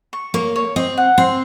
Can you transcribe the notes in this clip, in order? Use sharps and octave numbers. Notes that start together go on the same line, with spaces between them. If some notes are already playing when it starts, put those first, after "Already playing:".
C#6
A#3 C#5
C#5
C4 D#5
F#5
C4 C6